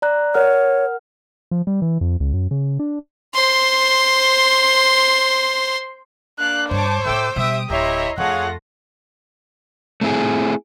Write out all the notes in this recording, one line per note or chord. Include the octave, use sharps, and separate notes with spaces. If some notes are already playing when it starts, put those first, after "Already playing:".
D5 A#5 F#6
A#4 C#5 F#5 F6
F3
G3
E3
F2
C#2
F#2
C#3
D4
C5 C6
A#3 D4 F5 F#6
G2 C5 C#5 A5 D6
A2 A3 A4 E5 G5 D6 E6
B2 G3 G4 E5 D#6 D7
D1 E4 G4 C#5 D#5 E5 A#5 C6
F2 A3 F4 G#4 C#5 F5 F#5 A#6
A3 C4 E4 G#4